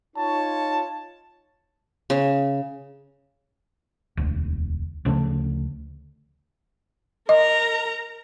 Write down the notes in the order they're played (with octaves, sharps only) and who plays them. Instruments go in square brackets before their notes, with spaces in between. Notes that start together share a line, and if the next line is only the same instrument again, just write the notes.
[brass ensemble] D#4 F4 C#5 [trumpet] A5
[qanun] C#3
[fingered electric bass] E1 D2
D2 C#3 F3 A3
[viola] A#4 A#5 [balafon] D#5